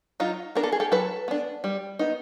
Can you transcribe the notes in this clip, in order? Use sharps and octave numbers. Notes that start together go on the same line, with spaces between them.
F#3 D#4 F4
B3 D4 A#4
A4
G#4
G4 A4
F#3 A4 B4
B3 D4
G3
B3 D#4